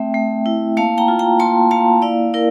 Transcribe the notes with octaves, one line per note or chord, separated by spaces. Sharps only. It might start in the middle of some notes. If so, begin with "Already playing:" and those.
Already playing: A3 C4 E5 G5
A3
E4
A#3 F5 A5
G5 A#5
F4
G5 A#5
A#3 A5 C6
A#3 F5 A5
E4 D5 F5
E4 A#4 D5